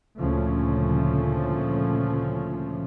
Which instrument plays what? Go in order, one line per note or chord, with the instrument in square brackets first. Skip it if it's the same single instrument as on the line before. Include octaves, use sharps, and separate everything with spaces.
[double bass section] D2 A#2 C#3 F3 A3 C#4